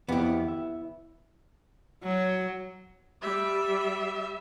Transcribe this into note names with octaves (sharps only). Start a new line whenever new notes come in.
F2 B3 E4 G4
E5
F#3
G3 E5